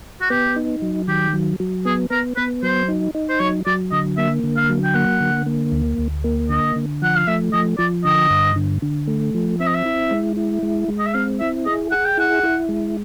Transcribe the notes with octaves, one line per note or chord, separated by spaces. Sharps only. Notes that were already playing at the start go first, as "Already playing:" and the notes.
F#4
B3 G4
D#4
F#3
D#3 G4
F#3
F#3
B3 G#4
B3 A#4
B3 B4
F#3 C5
D#4
D#4
C5
F#3 C#5
F#3 D5
D3 D#5
A#3 E5
D3
F5
F#3
G5
A#3 F#5
D3
A#3
D2
D2
A#3
D3 D#5
D3
F3 F#5
F5
A3 E5
F3 D#5
F3 D5
D3 D#5
G2
D3
D3
A3
F3
C4 E5
D#5
E5
E4
G#3
E4
G#3
G#3
D#5
E5
C4 F5
E4 E5
G#4 D#5
G#4 F#5
G5
E4 F#5
E4
G#3